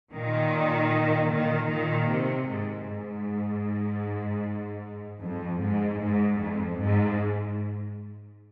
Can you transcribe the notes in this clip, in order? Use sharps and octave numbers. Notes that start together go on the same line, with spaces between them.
A#2 D#3
A#2 D#3
A#2 D#3
C3
G#2
G#2
F2
G#2
G#2
F2
G#2